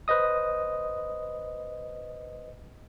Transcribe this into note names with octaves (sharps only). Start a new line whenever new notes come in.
B4 C5 D#5 D#6